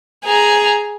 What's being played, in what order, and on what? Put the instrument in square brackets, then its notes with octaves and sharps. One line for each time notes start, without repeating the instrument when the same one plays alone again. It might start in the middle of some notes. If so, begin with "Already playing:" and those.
[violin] G#4 A#5